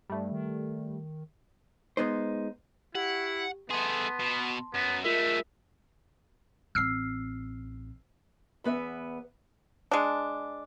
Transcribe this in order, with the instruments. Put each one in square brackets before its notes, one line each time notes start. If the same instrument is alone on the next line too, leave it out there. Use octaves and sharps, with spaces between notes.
[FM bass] G2 [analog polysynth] G3 A3
[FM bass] D#3
[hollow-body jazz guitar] G#3 B3 D#4 C5
[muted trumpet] E4 [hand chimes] G4 [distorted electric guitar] F#5
[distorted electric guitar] A3 G#4 [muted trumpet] B3 [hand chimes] A5 C6
[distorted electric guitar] B2
[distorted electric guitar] F#2 [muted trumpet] B3
[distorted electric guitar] G#3 A3 [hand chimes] F4 A#4 [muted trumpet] E5
[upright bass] A1 C4 [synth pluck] E6 F6 C7
[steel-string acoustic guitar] E2 B3 B4 E5
[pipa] G#3 D4